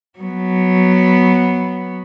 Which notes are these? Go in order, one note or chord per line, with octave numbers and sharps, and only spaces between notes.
F#3 B3